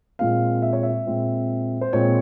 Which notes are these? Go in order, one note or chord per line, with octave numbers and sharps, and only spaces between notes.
A#2 G#3 C4 F4 F5
E5
C#5
E5
A#2 G#3 C4 F4
C5
A#2 G#3 C4 C#5